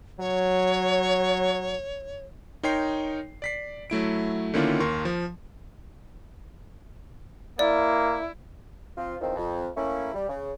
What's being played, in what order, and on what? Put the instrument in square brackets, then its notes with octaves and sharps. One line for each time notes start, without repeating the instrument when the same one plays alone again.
[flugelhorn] F#3 [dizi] C#5
[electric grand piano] D#4 A#4 C#5 G5 C6 C7
D5 B6 C7
F#3 A3 E4 D7
D3 D#3 A#3 C#4 E4 F4
D#2 A#3 A#4 C6 C#6
F3
[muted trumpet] A#3 [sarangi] E4 [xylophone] D5
[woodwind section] F3 C4 F4
E2 D#3 F3 C4
F2
A3 A#3 C#4 E4
G3
C#3